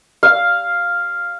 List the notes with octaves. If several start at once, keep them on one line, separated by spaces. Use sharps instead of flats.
F5